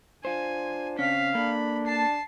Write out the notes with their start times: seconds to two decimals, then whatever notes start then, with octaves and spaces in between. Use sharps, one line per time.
0.25 D4 F4 C5 G#5
0.99 C#3 C4 C#4 F5 B6
1.35 A#3 D4 A4 B5
1.87 A5 C7